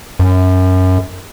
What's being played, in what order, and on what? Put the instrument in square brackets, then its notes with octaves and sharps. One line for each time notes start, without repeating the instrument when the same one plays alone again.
[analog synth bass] F#2